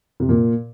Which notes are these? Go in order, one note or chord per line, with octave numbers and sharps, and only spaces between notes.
C3
A#2